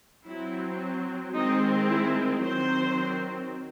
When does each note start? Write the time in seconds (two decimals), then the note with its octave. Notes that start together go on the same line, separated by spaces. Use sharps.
0.24 F#3 C4 E4
1.33 D#3 G#3 C4 D#4
1.88 E4
2.42 D#3 F#3 C4 C5